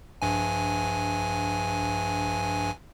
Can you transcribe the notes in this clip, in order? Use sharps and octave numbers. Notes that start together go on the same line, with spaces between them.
A#1 G2 G#5